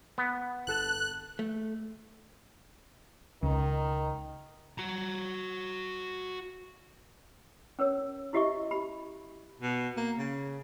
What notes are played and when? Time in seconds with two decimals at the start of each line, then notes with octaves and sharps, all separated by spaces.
0.18 B3
0.67 G1 A4 A5 F#6
1.39 A3
3.43 C#2 D#3
4.78 F#4 A#5
7.79 C#4 A#4 C#5 E6
8.33 E4 F#4 G4 D#5 E5 C#6
8.71 G4 B5
9.60 B2
9.97 A#3
10.17 C#3